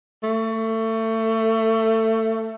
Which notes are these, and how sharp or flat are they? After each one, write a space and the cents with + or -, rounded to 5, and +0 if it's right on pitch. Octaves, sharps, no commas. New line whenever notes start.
A3 +25